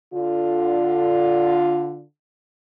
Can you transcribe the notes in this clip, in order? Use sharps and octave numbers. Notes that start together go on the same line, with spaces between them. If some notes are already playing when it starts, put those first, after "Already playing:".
D3 F4